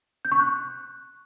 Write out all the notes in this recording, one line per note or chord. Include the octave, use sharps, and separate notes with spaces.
G6
C#6
F#6